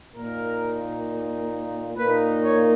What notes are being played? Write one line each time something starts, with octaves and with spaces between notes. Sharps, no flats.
A#2 A#3 D#4 A#4
A#2 A#3 D#4 B4
C#5